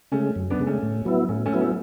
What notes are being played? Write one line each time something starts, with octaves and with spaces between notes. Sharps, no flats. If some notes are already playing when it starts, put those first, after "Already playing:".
C#3 G#3 A3 C#4
F#2
B3 D4
C#3 G#3
A3 C#4
A2
F#3 B3 E4
A2 A3 C#4
A3 C#4
F#3 B3 E4
A3 C#4